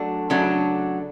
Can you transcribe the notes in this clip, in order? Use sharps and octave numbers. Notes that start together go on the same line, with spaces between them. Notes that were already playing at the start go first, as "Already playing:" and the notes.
Already playing: F#3 A3 D4
C#3 F#3 A3 D4